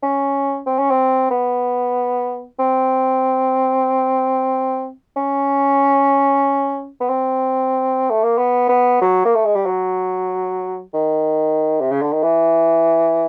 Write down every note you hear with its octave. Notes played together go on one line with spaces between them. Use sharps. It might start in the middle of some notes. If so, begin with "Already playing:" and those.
C#4
C4
C#4
C4
B3
C4
C#4
B3
C4
A3
A#3
B3
B3
F#3
A#3
A3
G#3
G3
F#3
D#3
C3
C#3
D3
D#3
E3